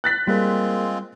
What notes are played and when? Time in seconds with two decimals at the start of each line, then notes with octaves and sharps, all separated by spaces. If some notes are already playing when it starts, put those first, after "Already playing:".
0.04 F#6 A6 B6
0.27 G3 G#3 A#3 C4 F4 G#4 A#4